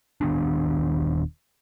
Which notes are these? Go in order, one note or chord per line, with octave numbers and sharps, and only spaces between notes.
D#1 D#3 B3 D4